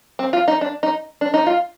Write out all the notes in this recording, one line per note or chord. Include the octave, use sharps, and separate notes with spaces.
C4
F4
D#4
D4
D#4
D4
D#4
F4